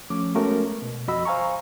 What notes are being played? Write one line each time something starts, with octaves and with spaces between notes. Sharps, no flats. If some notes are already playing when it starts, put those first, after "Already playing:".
F3 A3 C#4 D6
G#3 A3 B3 C#4 F#4 A#4
B2
F2 F#4 D#5 B5 E6
C5 F5 G#5 A#5 C#6